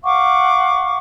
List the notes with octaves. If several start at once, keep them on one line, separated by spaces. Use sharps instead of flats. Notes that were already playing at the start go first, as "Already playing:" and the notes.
F5 F#5 C#6 D6